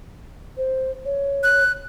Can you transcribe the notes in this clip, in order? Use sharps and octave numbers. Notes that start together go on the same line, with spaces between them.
C5
C#5
F#6